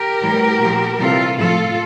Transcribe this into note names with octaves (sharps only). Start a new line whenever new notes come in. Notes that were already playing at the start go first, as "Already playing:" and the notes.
Already playing: G4 A#4
A2 E3 G3
A#2 F3
C3 E3 G3 F4 A4
A2 F3 F4 A4